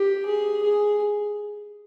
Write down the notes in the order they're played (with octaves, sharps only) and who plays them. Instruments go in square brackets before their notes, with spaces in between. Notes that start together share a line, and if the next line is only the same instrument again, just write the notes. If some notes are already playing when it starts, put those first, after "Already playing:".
Already playing: [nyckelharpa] G4
G#4
G#4